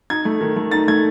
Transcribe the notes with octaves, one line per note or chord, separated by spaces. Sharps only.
D#4 G#6
A3
D#3
A3
D#4 A6
A3 G#6